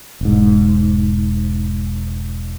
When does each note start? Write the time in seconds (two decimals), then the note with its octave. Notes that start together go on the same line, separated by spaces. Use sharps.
0.21 E1 G#2